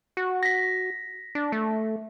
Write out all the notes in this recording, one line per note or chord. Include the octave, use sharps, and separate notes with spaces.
F#4
A#6 B6
D4
A3